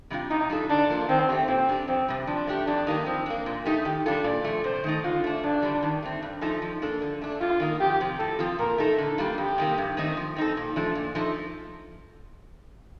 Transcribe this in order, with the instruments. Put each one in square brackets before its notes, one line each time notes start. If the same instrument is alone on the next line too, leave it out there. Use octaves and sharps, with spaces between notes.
[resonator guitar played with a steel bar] C3 G3 D4 F4
[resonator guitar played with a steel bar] C3 [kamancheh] D#4
[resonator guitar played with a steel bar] G3 D4 F4 A4
[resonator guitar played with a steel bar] D3 [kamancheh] D4
[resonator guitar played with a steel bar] F3 A#3 F4 A4
[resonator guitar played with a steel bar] D#3 [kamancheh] C4
[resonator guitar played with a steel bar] A3 C4 G4
[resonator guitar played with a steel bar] A#2 [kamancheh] C4
[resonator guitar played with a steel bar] G3 D4 G4
[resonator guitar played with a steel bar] F2 [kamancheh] C4
[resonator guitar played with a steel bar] C3 G3
[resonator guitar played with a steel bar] F3 [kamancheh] D4
[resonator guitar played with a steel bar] A3 D4 G4
[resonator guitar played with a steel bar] F2 [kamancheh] D4
[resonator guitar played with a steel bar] D#3 G3 A#3 D#4
[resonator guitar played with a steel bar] F3 [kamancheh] C4
[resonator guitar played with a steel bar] A#3 D4
A#2
A3 D#4 G4
[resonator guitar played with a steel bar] D#3 [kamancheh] G4
[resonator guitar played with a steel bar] G3 D4 F4 A4
[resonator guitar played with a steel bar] A#2 [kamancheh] D5
[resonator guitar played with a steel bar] F3 A3
[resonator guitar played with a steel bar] C3 [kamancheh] C5
[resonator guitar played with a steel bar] D#3 A3 D#4
[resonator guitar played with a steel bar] D3 [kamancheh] F4
[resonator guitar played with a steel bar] A3 D4
[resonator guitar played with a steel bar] G2 [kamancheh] D4
[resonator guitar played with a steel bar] D3 G3
D#3
A3 C4
G2
F3 A3 D#4 A4
F3
A#3 D4 A4
D3
A3 D4
[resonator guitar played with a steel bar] G2 [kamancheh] F4
[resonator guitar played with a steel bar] D#3 A#3 D#4
[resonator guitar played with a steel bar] F2 [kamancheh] G4
[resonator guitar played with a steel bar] C3 F3
[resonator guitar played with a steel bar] A2 [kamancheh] A4
[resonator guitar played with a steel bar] F3 C4 F4 A4
[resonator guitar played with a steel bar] A#2 [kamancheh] A#4
[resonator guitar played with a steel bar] A3 D#4 A4
[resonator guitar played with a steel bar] D3 [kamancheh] A4
[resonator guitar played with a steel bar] G3 A#3 D4 F4
[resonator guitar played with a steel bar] F2 [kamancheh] G4
[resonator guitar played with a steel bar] C3 D#3 A#3
G2
D#3 A3 C4 D#4
F3
C4 D#4 A4
A#2
F3 A3 D4
A#2
F3 A3 D#4 A4